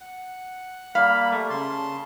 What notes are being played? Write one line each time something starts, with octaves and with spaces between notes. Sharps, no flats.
F#5
G3 A#3 F5 B5
A3
C#3 A5 C6